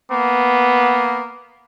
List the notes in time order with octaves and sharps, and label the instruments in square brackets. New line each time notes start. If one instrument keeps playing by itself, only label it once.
[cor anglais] A#3 [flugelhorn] B3